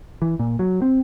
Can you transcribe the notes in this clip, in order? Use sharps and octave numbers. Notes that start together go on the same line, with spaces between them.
E3
A#2
F#3
C4